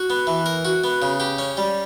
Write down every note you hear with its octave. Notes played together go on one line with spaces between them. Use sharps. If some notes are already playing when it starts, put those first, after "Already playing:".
Already playing: F#4
B3
E3
A#4
F#4
B3
C#3
G4
C#4
G3